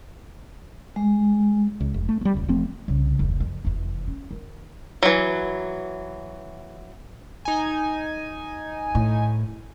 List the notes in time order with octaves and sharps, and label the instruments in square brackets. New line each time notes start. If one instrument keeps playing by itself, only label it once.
[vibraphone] G#3
[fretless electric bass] C#2
F1
A3
G3 A3
D#1 C#2
E1 F3 A3 C4
[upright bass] C2 C#3
F1 D2
F2
F1 E2
C#4
D#3
[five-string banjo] E3 F#3
[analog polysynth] D#4 G#5
[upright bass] A2